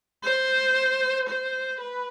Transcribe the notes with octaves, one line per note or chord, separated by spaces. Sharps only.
C5
C5
B4